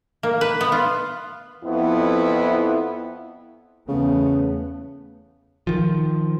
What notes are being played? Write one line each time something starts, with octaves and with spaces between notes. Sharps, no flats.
A#3
B4
B3
F4
F2 B3 E4
E2 C#3 A3 B3
D#3 F3